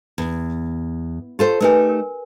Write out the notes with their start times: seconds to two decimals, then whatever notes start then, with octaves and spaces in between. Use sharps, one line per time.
0.18 E2
1.39 F4 G4 A4 C5 G5
1.60 A3 D#4 G4 A#4 B4 G#5
1.89 A#4